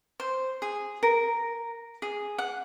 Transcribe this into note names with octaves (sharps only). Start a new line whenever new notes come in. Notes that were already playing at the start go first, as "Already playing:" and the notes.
C5
G#4
A#4
G#4
F#5